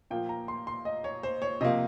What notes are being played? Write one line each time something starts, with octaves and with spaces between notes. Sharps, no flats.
A#2 F3 A#3 G5
A#5
C6
C6
D#5
C#5
C5
C#5
C3 F3 A#3 D#5